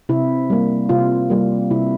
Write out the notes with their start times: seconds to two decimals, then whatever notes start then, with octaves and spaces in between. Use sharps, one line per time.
0.09 C3 E4
0.50 G3 A#3
0.89 C3 F4
1.30 G3 A#3
1.70 C3 E4